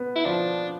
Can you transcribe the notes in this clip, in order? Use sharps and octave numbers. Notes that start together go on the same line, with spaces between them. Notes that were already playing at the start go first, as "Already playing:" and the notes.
Already playing: B3
E4
F3 D4